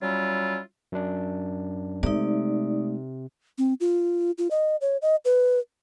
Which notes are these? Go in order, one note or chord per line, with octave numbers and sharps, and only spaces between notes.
F#3 G3 C#4 E4 F4
F#2 D4
C3 G#3 A3 D#4 D5
C4
F4
F4
D#5
C#5
D#5
B4